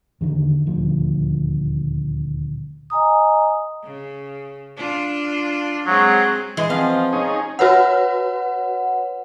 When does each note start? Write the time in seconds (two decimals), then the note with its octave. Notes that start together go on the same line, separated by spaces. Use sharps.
0.21 E2 D3 D#3
0.66 D#1 D2 F3
2.90 D#5 G#5 A#5 D#6
3.83 C#3
4.76 D4 F4
5.86 F#3 G#3 C4 G#4
6.57 E3 G#3 G#4
6.70 F3 B3 C4 D#5 F5
7.13 C#4 D#4 G#4
7.59 F#4 B4 C#5 F#5